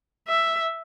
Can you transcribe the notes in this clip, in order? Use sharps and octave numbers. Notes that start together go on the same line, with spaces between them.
E5